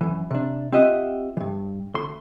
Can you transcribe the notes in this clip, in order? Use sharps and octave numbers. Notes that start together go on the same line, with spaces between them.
F#2 E3
C3 D4
C4 F4 G4 D#5 E5 F#5
G2 E3
D2 C6